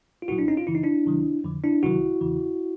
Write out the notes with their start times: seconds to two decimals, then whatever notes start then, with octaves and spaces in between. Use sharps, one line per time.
0.22 F4
0.28 C2 A#2 F#3 E4 F#4
0.38 D4 E4
0.48 C#4 D#4
0.57 F4
0.67 F#2 C#3 E3 E4
0.75 D#4
0.83 D4 E4
1.06 C#2 C3 D#3 F#3
1.44 F2 D3 F3
1.64 D4 E4
1.83 C2 C3 D#3 F#3 E4 F#4
2.21 E2 C#3 E3